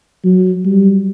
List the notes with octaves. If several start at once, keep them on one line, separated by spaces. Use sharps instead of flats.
F#3
G3